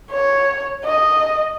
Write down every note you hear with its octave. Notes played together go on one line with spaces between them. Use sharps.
C#5
D#5